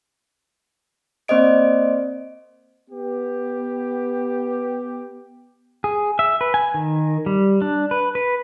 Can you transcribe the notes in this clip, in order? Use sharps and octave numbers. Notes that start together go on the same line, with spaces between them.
A#3 C4 C5 D5 D#5 D7
B3 G4
G#4
E5
B4
G#5
D#3
G3
D4
B4
B4